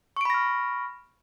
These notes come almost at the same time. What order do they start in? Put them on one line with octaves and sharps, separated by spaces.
C#6 D7 B5 A#6 F6